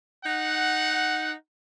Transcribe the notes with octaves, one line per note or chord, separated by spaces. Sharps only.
D#4 F#5